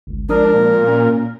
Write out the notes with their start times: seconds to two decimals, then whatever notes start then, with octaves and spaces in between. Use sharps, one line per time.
0.07 G1 C#2
0.29 F3 G#3 D4 A#4 D#6
0.54 A#2
0.84 A#3 C#4